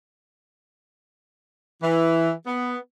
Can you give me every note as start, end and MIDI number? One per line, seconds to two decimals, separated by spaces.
1.82 2.30 52
2.46 2.77 59